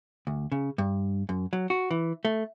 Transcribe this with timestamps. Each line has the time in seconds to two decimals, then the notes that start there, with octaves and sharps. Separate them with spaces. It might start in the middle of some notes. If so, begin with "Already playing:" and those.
0.27 D2
0.52 C#3
0.78 G2
1.29 F#2
1.53 F#3
1.70 F#4
1.91 E3
2.25 A3